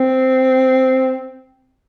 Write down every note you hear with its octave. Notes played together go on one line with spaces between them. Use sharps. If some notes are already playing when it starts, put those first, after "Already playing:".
Already playing: C4